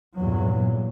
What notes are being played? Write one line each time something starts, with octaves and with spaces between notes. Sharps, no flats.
E2 G2 A#2 F#3